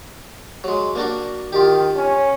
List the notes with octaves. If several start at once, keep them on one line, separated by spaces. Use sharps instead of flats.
F#3 G#3
A#3 D4 F#4
D#3 F4 G4
C#4